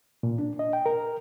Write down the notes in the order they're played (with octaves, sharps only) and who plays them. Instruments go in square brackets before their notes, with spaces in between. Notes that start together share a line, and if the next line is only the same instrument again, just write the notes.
[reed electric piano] A#2
D4
D#5
G5
A#4